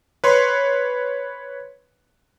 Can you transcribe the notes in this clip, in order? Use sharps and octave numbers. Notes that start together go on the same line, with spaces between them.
B4 C#5 C6